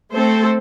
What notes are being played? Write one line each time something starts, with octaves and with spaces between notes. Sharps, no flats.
A3 C4 A4 C5